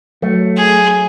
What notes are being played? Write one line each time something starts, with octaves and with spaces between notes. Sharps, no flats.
F#3 A3
G#4